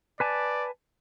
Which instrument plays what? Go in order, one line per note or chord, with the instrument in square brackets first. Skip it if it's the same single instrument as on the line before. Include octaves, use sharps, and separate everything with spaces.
[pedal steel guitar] B4 G#5 A5 [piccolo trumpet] D5